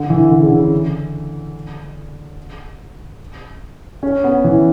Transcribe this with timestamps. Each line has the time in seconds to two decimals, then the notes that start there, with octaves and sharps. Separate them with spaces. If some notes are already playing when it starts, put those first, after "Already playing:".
Already playing: D3
0.10 E3
0.31 D3
0.40 C#3
0.50 D3
4.03 C#4
4.24 B3
4.44 E3